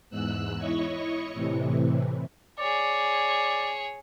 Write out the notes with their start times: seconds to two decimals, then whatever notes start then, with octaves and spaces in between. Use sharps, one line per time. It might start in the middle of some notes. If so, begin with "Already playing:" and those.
0.10 E2 G#2 E6 F#6
0.58 E4 C#5 D#5 C#6
1.33 A2 C3 E3
2.59 G#4 C#5 D5